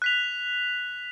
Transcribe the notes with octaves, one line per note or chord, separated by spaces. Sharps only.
F#6 B6 F7